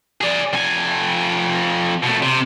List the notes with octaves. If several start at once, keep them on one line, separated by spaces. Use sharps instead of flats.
G#4 D5
F2 G#5
B2 A3
C3